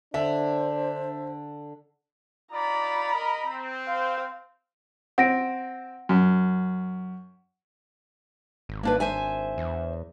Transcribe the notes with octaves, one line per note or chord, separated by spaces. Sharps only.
D3 D4 C5 E5
D#4 F4 D5 A#5 B5
A#4 D#5
C4
C5 F5
C4 F#5 A#6 D7
F#2
G#1
A#3 D4 B4
C5 E5 G#5
E2